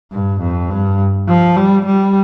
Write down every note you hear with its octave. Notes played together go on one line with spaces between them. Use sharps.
G2
F2
G2
F3
G3
G3